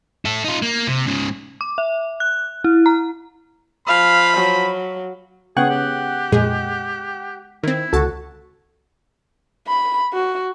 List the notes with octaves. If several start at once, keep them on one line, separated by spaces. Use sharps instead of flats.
E4 A4
D#4 F4
A#3
C3
G#2 C#3
D6
E5
F#6
E4
A#5
F3 F5 B5
F#3
C#3 B3 G#4 F#5 G5 C#6 F#6
G4
F2 A#2 G#3 G#4
D#3 C4 E4
C#2 D3 F#4 A4 A5
B5
F#4